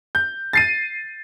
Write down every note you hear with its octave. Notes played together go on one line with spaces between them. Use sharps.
G6
A6 C7 D#7